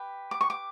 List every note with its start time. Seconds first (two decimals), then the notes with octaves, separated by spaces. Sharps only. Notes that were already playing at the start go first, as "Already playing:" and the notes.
Already playing: G4 B4
0.31 D6
0.41 C#6
0.50 D6